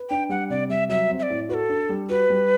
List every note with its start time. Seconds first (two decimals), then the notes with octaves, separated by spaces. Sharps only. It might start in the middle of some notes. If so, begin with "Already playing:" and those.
Already playing: B4
0.10 D4 G5
0.29 G3 F#5
0.50 C3 D5
0.69 G3 E5
0.89 F#3 E5
1.10 C4
1.19 E5
1.23 D5
1.30 A2
1.49 F#4 B4
1.54 A4
1.69 D4
1.89 G3
2.09 F#4 B4
2.30 G3